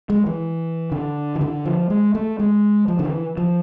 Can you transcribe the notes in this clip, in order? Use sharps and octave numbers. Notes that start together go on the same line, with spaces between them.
G#3
E3
D3
E3
D3
F3
G#3
A3
G#3
F3
D3
E3
F3